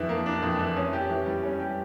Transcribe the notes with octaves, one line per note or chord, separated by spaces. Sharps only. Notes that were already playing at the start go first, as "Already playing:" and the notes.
Already playing: F2 E3 D4
A#3
D4
F2
E3
C#4
G4
E3
G3
C#4
G4